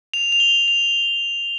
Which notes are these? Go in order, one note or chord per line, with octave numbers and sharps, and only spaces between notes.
F7
F7
G7
F7